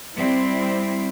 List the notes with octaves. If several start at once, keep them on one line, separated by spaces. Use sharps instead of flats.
G3 C4 E4